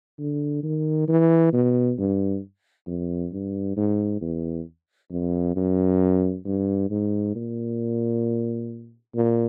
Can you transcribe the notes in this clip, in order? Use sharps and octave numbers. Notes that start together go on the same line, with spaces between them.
D3
D#3
E3
B2
G2
F2
G2
G#2
E2
F2
F#2
G2
G#2
A#2
A#2